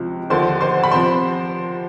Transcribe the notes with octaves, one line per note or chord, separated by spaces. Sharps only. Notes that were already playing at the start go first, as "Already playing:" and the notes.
Already playing: C#2 C3 F3
D#2 D3 F3 C5 C6
C5 C6
B5
C3 F3 C5 C6